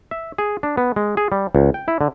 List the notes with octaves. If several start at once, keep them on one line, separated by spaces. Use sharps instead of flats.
E5
G#4
D4
B3
G#3
G#4
G3
C#2
G5
E4
D3